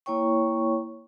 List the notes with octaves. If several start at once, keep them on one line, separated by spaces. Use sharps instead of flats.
A#3 E4 C#5 G5 C#6